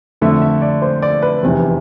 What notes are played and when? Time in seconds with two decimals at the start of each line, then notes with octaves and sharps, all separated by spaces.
0.21 F2 D3 A3 E5
0.42 E5
0.62 D5
0.82 C5
1.02 D5
1.22 B4
1.43 F1 E2 C3